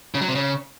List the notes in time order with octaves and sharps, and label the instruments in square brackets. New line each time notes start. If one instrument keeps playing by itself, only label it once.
[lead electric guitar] C#3
F#3
C3
C#3